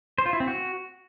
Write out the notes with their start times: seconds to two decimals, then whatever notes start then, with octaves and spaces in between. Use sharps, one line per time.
0.18 C5
0.26 F4
0.33 E4
0.40 C4
0.48 F#4